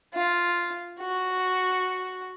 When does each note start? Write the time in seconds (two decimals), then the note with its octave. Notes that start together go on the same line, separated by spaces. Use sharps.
0.14 F4
1.00 F#4